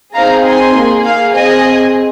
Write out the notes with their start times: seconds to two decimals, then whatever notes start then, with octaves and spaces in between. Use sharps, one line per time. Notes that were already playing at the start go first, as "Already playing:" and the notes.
0.14 C4 D#4 G#4 F5 A#5
0.44 G#5 C6
0.74 A#3 G#4
1.04 F5
1.35 C4 G#4 D#5 G#5